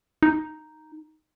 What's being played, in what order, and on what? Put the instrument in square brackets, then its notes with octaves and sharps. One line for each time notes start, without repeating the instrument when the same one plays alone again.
[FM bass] D#4